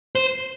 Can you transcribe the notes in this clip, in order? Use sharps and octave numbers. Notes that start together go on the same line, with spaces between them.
C5